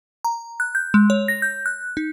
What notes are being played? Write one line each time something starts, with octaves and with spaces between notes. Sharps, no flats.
A#5
F#6
G6
G#3
C#5
A#6
G6
F#6
D#4